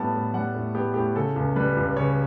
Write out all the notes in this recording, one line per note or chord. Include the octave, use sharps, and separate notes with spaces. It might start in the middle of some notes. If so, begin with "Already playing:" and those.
Already playing: A2 G3 B3 A5
A2
G3 F#5
A2
B3 G4
A2 G4
C#3 A4
C#2
G3 B4
C#2
C#3 C#5